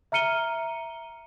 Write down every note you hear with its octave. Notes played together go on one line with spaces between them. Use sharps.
E5 A#5 F6 C#7 D#7 G7